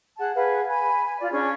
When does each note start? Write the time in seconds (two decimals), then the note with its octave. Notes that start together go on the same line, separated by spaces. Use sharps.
0.17 G#4 F#5 A5
0.34 G#4 B4 F5 F#5
0.68 G#5 B5
1.04 G#5
1.19 F4 D5
1.32 C#4 D4 G#4